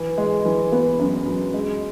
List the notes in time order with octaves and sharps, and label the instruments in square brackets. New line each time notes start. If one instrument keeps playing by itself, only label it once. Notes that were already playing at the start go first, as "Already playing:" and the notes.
Already playing: [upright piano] E3
G#3
E3
B3
F#2
F#2
G#3